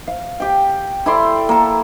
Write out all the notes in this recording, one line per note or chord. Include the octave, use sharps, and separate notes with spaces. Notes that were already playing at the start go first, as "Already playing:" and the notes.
F5
G4 G5
E4 A4 D5 C6
A#3 A4